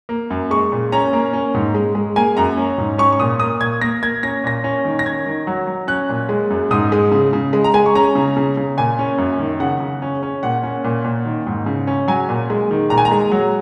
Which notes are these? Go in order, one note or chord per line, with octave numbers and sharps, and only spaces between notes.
A#3
F#2
G#3 C#6
A#2
C#4 A#5
A#3
C#4
G#2
G#3
G#3
A#3 G#5
F#2 A#5
C#4
G#2
C#4 C#6
C#6
A#2 D#6
A#3 D#6
A#2 G#6
A#3 A#6
A#3 G#6
C#4 A#6
A#2 A#6
C#4
D#3
A#6
C#4 G#6
D#3
F#3
F#3
C#4 F#6
A#2
G#3
F#2
G#2 D#6
G#3
C#3
C#3
G#3
A#5
G#3 G#5
C#6
C#4 A#5
C#3
C#3
C#3
A#2 G#5
C#4
F#2
D#3
C#3 F#5
C#3
C#4
C#4
A#2 F#5
C#4
A#2
A#2
D#3
G#2
C#3
C#4
F#3 G#5
A#2
G#3
D#3
A#2 A#5
G#5
A#5
G#3
F#3